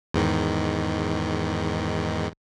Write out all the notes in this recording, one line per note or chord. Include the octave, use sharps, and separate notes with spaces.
E2 G#2 D#3